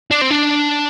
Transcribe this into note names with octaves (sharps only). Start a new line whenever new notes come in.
D4
C4
D4